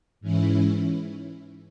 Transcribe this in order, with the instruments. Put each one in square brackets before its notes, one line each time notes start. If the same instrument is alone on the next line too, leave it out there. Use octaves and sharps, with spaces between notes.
[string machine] G#2 E3 C#4 E4